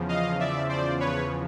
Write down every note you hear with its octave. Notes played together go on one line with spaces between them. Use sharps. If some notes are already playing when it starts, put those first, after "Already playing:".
Already playing: E2 C#3 F3
D#5 F5
D5 E5
C5 D5
B4 C#5